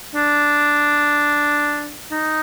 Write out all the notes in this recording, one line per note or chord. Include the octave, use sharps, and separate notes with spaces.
D4
D#4